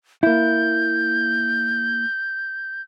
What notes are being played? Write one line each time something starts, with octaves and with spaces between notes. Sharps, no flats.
A#3 E4 G6